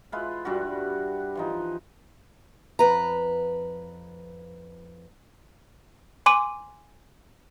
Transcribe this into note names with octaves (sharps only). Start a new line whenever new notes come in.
G#3 E4 F4 B4
G2 G3 D4 F#4
E3 F3 D#4
F2 B4 A#5
G#5 C6 D6 D#7